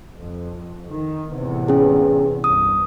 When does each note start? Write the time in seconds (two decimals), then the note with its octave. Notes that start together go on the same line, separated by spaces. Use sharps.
0.16 F2
0.90 D#3
1.35 E2 A2 C3
1.68 C#4 G#4
2.44 C2 G2 D#6